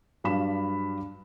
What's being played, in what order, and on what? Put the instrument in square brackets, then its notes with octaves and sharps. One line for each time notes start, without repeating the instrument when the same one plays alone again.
[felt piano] G2 F#3 D4 F5 B5 E7